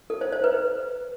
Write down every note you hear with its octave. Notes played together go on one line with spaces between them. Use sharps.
A4
C5
C5
B4